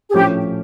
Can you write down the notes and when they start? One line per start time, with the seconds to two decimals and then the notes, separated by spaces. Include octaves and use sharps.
0.09 G#4
0.14 A#1 A2 F3 A3 C#4 G4